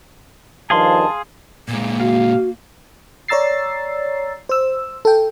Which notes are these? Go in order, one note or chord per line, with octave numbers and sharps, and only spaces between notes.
G2 D#3 F3 G#4 F5 A5 C6
A#2 G#3 A#3
F#4 F5
C#5 D5 A#5 E6 A6 C7
C5 E6
A4 G5